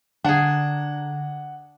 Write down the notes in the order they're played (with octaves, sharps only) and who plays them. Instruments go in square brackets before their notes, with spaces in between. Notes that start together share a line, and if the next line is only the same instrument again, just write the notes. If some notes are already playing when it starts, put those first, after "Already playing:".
[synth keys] D3 A#5 [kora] D4 G#4 [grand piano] F#5